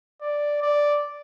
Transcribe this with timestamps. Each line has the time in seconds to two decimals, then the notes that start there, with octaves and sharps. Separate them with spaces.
0.21 D5
0.62 D5